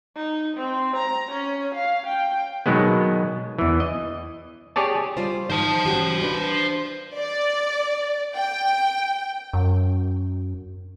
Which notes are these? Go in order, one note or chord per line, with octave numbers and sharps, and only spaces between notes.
D#4
C4
A#5
C#4
F5
G5
B2 D#3 F#3 G#3 B3
E2 E3
D#5
G4 G#4 C#5 D5 A5
G3 F4 C5
G#2 D#3 C5 A5
C#4 F#4 G4
D4 B4
D5
G5
F#2